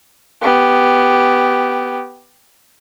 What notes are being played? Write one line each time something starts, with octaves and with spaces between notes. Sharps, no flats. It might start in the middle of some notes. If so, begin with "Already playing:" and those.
B3 G4